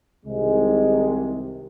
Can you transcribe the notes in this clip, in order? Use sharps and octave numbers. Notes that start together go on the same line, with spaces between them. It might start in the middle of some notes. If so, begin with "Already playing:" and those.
C2 C3 D#3 G#3